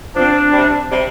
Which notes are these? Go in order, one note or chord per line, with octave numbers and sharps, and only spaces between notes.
F3 C4 D4
C3 G3 C4
C3 G3 C4